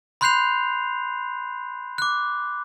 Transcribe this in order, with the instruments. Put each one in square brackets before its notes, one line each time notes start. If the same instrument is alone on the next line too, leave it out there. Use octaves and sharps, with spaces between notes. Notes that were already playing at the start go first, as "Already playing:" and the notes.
[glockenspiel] B5 C6 F#6 G6 C7 F7
D6 F#6